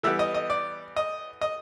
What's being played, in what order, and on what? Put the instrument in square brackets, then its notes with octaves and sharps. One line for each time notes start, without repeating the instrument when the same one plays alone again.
[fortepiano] E3 G3 B3 E5
D#5
D#5
D5
D#5
D#5